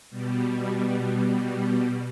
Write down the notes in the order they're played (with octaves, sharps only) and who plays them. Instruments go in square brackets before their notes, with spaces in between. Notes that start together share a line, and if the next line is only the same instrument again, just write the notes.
[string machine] B2 G3